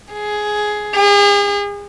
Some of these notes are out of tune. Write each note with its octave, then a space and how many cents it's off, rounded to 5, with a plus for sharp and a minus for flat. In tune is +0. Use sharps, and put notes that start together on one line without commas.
G#4 +10
G#4 -40